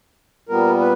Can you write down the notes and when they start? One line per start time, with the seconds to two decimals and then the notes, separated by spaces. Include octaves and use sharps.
0.49 A#2 G3 B3 A#4
0.80 B4